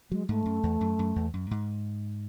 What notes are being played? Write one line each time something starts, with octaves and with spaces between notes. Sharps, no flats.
F#3 G#3
G#2 A3
F#2
E2
F#2
F#2
E2
F#2
G#2